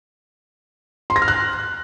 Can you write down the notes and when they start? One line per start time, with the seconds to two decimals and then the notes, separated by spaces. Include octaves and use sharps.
1.10 C6
1.16 A#6
1.22 F6
1.28 F#6